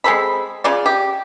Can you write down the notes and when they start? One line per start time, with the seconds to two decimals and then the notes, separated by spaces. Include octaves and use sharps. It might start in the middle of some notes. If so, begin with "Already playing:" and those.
0.04 G#3 C4 A4 B5
0.64 C#3 F4 D5
0.86 G4